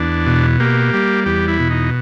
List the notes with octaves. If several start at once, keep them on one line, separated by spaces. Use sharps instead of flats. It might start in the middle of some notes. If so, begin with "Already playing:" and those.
Already playing: E2 D4
B2
A#3 G4
G3
E2 G4
E4
B2
D#4